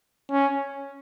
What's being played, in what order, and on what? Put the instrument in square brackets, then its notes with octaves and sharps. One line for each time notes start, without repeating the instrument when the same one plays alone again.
[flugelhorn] C#4